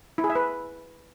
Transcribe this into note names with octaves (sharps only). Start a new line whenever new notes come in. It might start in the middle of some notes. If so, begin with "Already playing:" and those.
E4
G#4
E5
B4